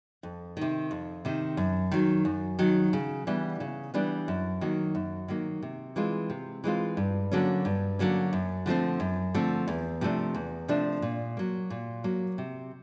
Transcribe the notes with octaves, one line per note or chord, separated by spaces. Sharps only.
F2
C3 D#3
F2
C3 D#3
F#2
D#3 F#3
F#2
D#3 F#3
C#3
E3 G3 B3 D4
C#3
E3 G3 B3 D4
F#2
D#3 F#3 A#3
F#2
D#3 F#3 A#3
C3
E3 G#3 C4 F4
C3
E3 G#3 C4 F4
G2
D3 F#3 A#3 C#4
G2
D3 F#3 A#3 C#4
F#2
D3 F3 A3 C4
F#2
D3 F3 A3 C4
E2
C3 F3 A3 D4
E2
C3 F3 A3 D4
A#2
F#3 A#3
A#2
F#3 A#3
C3